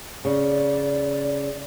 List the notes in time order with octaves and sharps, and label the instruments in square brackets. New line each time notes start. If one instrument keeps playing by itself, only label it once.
[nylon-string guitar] C#3 [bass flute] D5